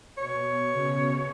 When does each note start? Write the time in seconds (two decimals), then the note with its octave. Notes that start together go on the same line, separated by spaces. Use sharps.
0.17 B2 C#5
0.71 C#3